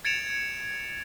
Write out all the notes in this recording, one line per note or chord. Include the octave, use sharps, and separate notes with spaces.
G#6 A6 C#7 D7 E7 F7